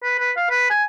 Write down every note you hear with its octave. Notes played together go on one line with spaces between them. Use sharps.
B4
B4
F5
B4
G#5